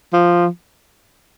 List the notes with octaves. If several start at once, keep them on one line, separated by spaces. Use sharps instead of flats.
F3